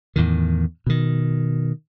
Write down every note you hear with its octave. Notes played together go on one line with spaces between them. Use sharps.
E2 A2 D#3
B2 D#3